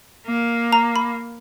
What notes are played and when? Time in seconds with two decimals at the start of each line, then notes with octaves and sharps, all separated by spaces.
0.27 A#3
0.72 A#5
0.96 B5